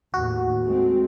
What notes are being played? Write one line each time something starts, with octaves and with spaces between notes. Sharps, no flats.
D#2 A2 F#4
G#3 A3 C4